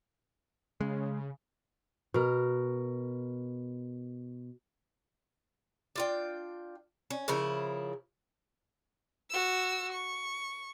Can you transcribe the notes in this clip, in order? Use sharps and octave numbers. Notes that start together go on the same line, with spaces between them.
C#3 G#3
B2 A#4
D4 F4 G5
C#4
C#3 F3 E4 A#4
F#4 E6
C#6